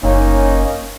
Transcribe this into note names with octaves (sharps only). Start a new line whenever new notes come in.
F#1 A#3 C#4 D#4